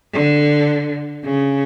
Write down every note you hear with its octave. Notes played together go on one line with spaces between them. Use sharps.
D3
C#3